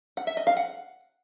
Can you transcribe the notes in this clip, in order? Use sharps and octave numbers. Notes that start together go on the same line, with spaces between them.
F#5
E5
D#5
F5
F#5